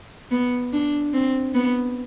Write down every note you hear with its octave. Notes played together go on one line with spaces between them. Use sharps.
B3
D4
C4
B3